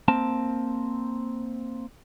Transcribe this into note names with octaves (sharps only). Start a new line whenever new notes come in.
A#3 C4 A5